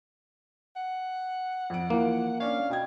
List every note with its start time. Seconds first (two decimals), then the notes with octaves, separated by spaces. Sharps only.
0.76 F#5
1.70 F2 D7
1.90 E3 F3 A#3
2.40 C#4 D4 F5
2.70 B2 G5 G#6